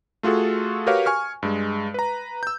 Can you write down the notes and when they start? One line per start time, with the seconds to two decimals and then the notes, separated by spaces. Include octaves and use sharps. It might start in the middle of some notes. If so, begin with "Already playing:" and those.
0.23 A3 F4 F#4 G#4 A4
0.86 F#4 G4 A#4 B4 C#5 F5
1.06 G#5 C#6 F6
1.43 G2 G#3
1.94 B4 A#5
2.43 E6 G6